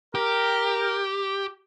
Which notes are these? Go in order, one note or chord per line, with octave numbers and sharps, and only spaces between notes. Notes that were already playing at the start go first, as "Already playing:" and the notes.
G4 A#4